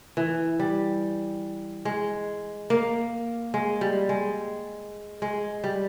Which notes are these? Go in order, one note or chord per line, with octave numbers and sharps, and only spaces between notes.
E3
G3
G#3
A#3
G#3
G3
G#3
G#3
G3